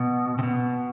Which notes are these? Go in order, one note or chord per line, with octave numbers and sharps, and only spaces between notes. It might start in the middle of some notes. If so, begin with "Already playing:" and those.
Already playing: B2
C3
B2